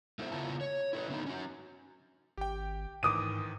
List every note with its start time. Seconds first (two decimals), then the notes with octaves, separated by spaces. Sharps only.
0.19 A3 B3 E4 A4 C5 E5
0.32 C#3 B3 E4 F4 A#4 A5
0.61 C#5
0.93 E4 A4 B4
1.10 D3 A3 B3 C#4 D#4
1.26 C#4 F#4
2.37 G#1 G4 G5
3.03 D2 G#2 D#3 E3 D6 D#6 D#7